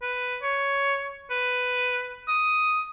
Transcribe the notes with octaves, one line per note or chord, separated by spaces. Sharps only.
B4
C#5
B4
D#6